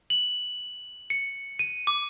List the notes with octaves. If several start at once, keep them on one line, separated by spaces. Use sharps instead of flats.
F#7
C#7
D#7
D6